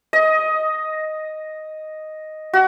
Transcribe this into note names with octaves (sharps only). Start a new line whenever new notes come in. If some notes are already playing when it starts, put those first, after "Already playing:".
D#5
F#4